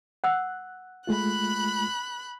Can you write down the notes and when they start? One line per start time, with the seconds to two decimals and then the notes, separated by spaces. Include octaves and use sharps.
0.24 F#5 E6 F#6
1.07 G#3 A3 F4 B5 F#6